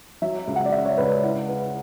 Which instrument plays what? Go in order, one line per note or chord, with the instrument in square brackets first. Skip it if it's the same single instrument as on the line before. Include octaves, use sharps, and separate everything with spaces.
[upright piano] F#3 [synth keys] E5
[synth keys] E5
[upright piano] C#2
[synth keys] F#5
D5
[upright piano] C#3 [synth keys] E5
[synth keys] C#5
[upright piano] C#2 [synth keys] B4
[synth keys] E5
[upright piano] E4 [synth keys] F#5
[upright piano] B4